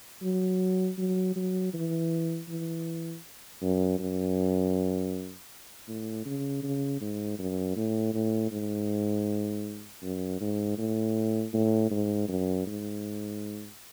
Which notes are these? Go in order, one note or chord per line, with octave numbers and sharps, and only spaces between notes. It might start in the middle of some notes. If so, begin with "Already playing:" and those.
F#3
F#3
F#3
E3
E3
F#2
F#2
A2
C#3
C#3
G#2
F#2
A2
A2
G#2
F#2
G#2
A2
A2
G#2
F#2
G#2